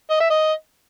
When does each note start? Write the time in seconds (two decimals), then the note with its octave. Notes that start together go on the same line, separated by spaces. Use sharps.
0.10 D#5
0.20 E5
0.30 D#5